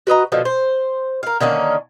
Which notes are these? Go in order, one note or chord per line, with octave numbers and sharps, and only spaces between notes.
F#4 B4 D#5 A#5
B2 D3 F3
C5
A#4 F5
D3 D#3 A#3 C#4